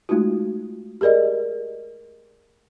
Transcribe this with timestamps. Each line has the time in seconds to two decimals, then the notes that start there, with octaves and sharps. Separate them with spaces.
0.09 G#3 A3 D#4 F4 F#4
1.01 G4 G#4 A#4 D5 D#5